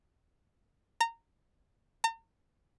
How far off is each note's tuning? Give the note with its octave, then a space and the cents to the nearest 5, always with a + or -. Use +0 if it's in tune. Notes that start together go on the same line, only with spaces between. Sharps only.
A#5 -20
A#5 -45